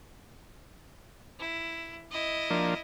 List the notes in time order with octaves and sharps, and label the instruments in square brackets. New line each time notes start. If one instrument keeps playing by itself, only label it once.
[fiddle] E4
E4 D#5
[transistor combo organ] F3 A#3 D4